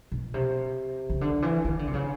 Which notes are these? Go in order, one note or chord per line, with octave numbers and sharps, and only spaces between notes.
B2
C3
C#3
D3
E3
D#3
D3
C3
C#3